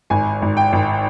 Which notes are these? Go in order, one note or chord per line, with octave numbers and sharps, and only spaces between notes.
G#1 G#5
G#1
G5
G#1